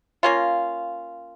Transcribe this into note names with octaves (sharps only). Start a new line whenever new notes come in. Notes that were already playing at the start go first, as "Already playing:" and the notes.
A#3 C#4 F4